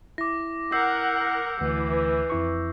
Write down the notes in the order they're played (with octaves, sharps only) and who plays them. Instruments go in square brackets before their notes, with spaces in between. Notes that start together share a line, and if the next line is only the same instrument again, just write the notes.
[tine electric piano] E4 [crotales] D6 A#6
[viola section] A#4 F#5 [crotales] E6 G6 C7
[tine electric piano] D2 [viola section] E3
[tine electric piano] F2 E4 C#6